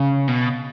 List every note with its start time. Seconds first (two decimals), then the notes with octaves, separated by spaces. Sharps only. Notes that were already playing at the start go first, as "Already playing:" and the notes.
Already playing: C#3
0.28 B2